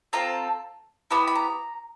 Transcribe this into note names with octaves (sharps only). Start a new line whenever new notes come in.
C4 F4 A4 A#5
B3 E4 G4 B5
B5
A#5